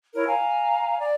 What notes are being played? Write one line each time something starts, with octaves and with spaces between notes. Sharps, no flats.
E4 A#4 C#5
F5 G#5 A#5
D5